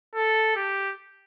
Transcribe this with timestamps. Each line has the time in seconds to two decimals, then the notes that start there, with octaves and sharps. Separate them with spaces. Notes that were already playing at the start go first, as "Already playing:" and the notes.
0.15 A4
0.56 G4